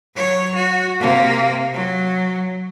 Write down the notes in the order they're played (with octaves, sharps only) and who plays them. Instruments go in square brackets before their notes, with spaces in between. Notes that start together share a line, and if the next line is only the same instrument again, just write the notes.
[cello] F#3 C#5
F#4
C3 A#3
F#3